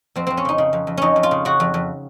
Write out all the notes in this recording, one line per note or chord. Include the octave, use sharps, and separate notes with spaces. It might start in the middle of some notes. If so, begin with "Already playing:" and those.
F2 C4
F2 C4
C#4
C#3 D#4
C#3
F2
F2
F2 C#4 D#4
F2
F4
C#3
C#3 F#4
F2
F2